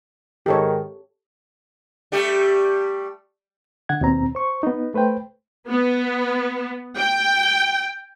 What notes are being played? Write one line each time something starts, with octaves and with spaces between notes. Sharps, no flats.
G#2 D#3 G4 A4 C#5
G3 A3 G4
D3 F#5 G#6
D#2 B2 C4 A#5
C5 C#6
B3 D#4
A3 B4 C5 G5
B3
G5